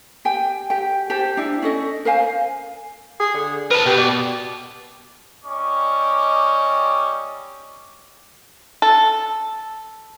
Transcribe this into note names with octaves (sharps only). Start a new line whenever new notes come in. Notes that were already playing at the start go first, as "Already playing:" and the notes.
G4 G5 G#5
G4 G5
G4 C5 A5
D4 E4
C#4 A4 D#5
A#4 C5 F5 G#5
G#4
D3
A#4 B4 A5
B2 G4
D5
G3 C#4 D#5 C#6 D6
A4